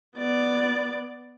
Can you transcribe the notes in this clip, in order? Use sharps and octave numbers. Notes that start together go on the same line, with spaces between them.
B3 D5